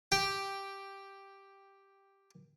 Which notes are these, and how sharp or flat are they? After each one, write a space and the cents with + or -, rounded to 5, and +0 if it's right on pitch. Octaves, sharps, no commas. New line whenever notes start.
G4 +0 G5 +5